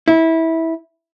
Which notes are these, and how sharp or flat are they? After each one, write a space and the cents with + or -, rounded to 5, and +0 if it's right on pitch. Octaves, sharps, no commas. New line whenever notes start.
E4 -20